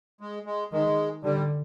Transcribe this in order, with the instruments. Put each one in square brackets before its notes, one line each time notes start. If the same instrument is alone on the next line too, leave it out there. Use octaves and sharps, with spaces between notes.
[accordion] G#3
G#3
[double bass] D#3 [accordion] G#3
[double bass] D3 [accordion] G3